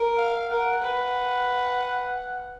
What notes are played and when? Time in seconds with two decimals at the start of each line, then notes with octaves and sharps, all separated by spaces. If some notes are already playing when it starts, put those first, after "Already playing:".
Already playing: A#4
0.17 F5
0.50 A#4 F#5
0.82 B4